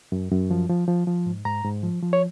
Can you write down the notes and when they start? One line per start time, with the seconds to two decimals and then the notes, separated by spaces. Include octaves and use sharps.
0.12 F#2
0.32 F#2
0.51 F3
0.69 F3
0.88 F3
1.07 F3
1.26 G#2
1.45 G#2 A#5
1.64 G#2
1.83 F3
2.02 F3
2.13 C#5